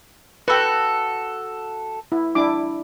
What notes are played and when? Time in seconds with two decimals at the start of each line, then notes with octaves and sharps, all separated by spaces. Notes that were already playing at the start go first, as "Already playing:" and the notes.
0.48 F#4 A4 B4 G5
2.12 E4
2.35 D4 E4 D6